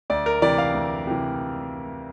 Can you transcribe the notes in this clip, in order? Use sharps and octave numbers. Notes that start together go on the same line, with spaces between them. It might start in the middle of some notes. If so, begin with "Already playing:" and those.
D2 D5
A#4
C3 E3 D5
F5
D2
C3 E3